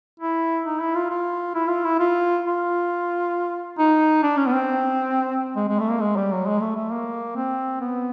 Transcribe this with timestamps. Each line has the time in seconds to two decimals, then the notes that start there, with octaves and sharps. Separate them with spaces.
0.20 E4
0.65 D#4
0.80 E4
0.95 F4
1.10 F4
1.55 E4
1.68 F4
1.84 E4
1.99 F4
2.44 F4
3.78 D#4
4.23 D4
4.37 C#4
4.46 B3
4.53 C4
5.56 G#3
5.68 G#3
5.80 A3
5.90 A#3
6.01 G#3
6.16 G3
6.32 F#3
6.46 G#3
6.61 A3
6.75 A3
6.91 A#3
7.36 C4
7.81 B3